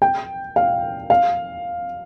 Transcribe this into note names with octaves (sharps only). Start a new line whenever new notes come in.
G5
F5
F5